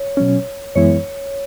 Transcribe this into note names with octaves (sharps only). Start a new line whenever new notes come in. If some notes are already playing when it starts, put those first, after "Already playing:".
Already playing: C#5
B2 F#3 C#4
F#2 E3 G#3 B3 E4 C#5